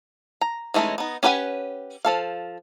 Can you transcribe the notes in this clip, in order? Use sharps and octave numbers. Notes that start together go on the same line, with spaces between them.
A#5
E3 G#3 A3 C#4 D#4
B3 D#4
C#4 G4 B4 F#5 G#5
F3 A4 F5